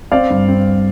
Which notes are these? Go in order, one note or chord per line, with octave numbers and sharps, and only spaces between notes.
C4 D5 F5
G2
C4